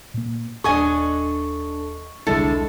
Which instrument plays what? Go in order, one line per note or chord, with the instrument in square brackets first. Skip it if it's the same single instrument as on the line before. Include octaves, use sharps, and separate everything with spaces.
[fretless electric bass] A#2 A#3
[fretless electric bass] D#1 [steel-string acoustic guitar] D4 A4 [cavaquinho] D#5 G#5 D#6 [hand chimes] C#6
[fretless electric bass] E1 C2 [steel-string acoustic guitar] D3 G#3 E4 [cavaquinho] A4